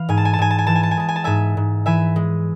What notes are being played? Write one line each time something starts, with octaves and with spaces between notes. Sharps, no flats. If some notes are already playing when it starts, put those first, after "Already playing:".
Already playing: E3 F5
G#2 G#5
A5
G#5
A5
G#2 G#5
A5
G#5
E3 A5
G#5
A5
G#5
G#3 A5
G#5
A5
G#2 E5 G#5
G#2
E3 E5 G#5
G#3